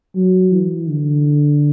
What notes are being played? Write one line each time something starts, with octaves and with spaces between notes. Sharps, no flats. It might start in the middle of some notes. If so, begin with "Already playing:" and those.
F#3
E3
D3